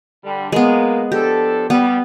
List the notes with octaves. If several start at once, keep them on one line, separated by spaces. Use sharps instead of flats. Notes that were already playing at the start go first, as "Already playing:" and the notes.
D3 G3
G#3 A#3 B3
F3 D4 G4 A4
G3 B3